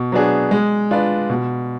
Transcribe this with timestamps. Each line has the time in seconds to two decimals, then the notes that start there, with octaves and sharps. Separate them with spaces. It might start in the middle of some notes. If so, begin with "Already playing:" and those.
Already playing: B2
0.12 F#3 B3 D4 G#4
0.51 G#3
0.91 D4 F4 B4 D5
1.30 B2